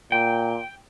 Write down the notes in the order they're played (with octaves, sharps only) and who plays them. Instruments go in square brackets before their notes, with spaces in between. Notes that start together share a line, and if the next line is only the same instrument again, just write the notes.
[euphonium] A#2 [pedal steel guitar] G5